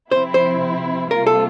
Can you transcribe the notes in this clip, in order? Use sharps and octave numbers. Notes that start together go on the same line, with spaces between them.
C3 F3 C4 E4 C5
C5
C3 G3 A#3 F4 A#4
A4